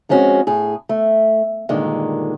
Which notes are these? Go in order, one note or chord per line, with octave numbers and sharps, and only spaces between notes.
F3 G#3 C4 C#4 E4 F#4
A2 G#4
A3
G2 A#2 D3 D#3 G#3